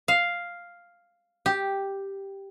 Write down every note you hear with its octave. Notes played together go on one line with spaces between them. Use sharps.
F5
G4